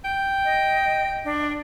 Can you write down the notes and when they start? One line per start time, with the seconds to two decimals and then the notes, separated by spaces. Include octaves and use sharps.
0.05 G5
0.45 D#5
1.25 D4